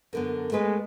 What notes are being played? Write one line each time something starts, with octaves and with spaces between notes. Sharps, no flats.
F#2 D3 B3 A4 A#4
G#3 A3 B3 B4